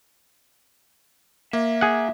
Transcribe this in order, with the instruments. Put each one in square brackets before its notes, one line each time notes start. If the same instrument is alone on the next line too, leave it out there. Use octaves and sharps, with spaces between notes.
[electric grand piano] A#3 [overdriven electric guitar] E5
[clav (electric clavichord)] G#4 F#5